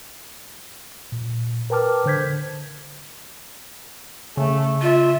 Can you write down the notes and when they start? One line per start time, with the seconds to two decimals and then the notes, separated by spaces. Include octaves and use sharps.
1.12 A#2
1.70 A#4 B4 G5 A5 D6 F6
2.06 D3 C5 G6 G#6 B6
4.37 C#3 A3
4.82 F4 E5